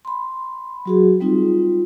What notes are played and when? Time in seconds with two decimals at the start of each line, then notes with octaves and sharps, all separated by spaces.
0.05 B5 C6
0.86 F#3 F#4 G#4
1.20 G3 C4 D#4 F4